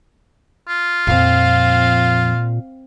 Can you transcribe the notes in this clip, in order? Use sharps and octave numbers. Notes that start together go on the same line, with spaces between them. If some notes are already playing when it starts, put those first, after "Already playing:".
F4
F2 A#2 F3 C4 F5